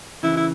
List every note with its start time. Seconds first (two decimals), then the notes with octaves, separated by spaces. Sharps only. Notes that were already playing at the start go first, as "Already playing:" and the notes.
0.23 C#3 E3 E4
0.37 E4